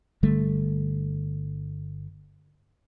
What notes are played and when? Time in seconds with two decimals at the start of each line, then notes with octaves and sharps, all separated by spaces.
0.23 G1 D3 G3 A3